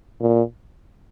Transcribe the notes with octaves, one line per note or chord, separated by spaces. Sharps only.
A#2